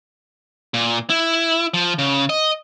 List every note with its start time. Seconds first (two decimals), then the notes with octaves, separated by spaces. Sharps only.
0.74 A#2
1.10 E4
1.74 F3
1.98 C#3
2.29 D#5